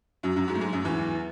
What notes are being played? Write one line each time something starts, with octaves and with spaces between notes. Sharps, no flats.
F#2 F#3
F#2 F#3
G#2 G#3
A3
G#2 G#3
F#2 F#3
E2 E3